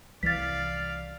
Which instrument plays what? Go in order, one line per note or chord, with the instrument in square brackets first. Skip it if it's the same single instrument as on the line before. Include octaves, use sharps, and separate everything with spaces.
[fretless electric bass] C2 E3 [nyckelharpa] D5 F5 [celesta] A6 B6